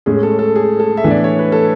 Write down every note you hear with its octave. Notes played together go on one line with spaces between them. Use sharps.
A2 G#3 C#4 G#4
A4
A4
G#4
A4
E5
A2 E3 B3 D4
D5
C#5
B4
A4